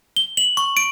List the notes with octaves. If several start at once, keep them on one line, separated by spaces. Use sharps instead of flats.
G7
F#7
C#6
D7